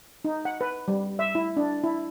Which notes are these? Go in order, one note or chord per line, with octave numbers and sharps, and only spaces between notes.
D#4
F#5
B4
G3
E5
E4
D4
E4